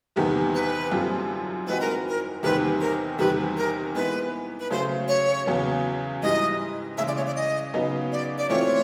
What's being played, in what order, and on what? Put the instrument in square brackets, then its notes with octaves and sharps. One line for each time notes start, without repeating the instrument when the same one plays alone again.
[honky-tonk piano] E2 C3 D#3 G3 B3
[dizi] B4
[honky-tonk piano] F#2 D3 G3 C4 F4
[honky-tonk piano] E3 G#3 C4 D#4 F#4 [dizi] B4
[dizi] A#4
A#4
[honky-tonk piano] E2 C3 D#3 G3 C4 [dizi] B4
[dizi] A#4
[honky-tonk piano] E2 C3 D#3 G3 [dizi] B4
[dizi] A#4
[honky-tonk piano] E3 G#3 B3 [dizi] B4
[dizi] B4
[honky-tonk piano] C#3 F#3 A3 [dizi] C5
[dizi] C#5
[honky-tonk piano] E2 C#3 F#3 B3
[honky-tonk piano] G#2 E3 G3 [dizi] D#5
[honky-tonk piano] C#3 E3 G#3 [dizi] E5
[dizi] D5
C#5
D5
D#5
[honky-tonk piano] C#3 F#3 B3 D#4
[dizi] D5
D5
[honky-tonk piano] E3 A3 C4 F4 [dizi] C#5